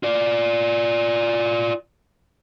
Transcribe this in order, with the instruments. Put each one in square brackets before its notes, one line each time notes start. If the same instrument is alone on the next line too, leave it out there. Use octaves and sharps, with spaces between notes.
[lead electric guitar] F4 D5